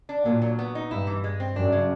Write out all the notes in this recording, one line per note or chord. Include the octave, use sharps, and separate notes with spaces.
D4
A#2 F#3
F#3
B3
D#4
G2 E4
E3
G#3
C4
F#2 D4
C#3